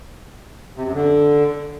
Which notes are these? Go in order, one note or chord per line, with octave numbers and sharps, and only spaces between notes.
C3
F#2
D3